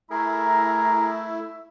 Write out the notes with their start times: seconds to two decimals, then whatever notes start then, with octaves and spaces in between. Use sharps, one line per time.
0.11 A3 E4 G#4 A#4 A#5
1.07 E5